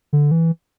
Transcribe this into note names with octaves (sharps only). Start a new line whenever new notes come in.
D3
E3